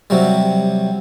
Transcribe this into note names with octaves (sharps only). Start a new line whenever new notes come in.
C3 F#3 G3